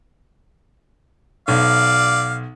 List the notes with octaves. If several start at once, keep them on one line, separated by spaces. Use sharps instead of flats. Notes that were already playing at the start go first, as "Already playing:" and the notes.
B1 D5 F5